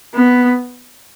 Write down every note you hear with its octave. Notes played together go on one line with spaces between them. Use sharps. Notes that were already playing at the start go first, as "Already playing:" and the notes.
B3